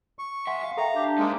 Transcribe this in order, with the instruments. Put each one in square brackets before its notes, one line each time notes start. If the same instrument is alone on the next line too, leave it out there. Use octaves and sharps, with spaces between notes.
[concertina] C#6
[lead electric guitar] B1 E5 [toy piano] F#5 G#5 C6
[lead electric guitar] F5
[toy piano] A4 E5 G5 [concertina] A#5
[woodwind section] D4 G4
[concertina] G#3 A#3 [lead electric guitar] D#4 C5